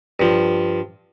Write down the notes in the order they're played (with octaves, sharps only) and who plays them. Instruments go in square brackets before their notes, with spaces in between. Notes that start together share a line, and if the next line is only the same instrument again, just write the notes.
[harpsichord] G2 F3